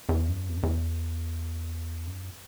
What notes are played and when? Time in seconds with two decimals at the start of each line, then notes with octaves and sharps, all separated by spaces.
0.09 E2
0.28 F#2
0.49 E2
0.56 F#2
0.63 E2
2.07 F#2